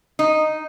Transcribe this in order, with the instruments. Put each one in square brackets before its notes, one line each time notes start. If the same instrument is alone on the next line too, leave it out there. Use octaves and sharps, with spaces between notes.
[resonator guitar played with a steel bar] D#4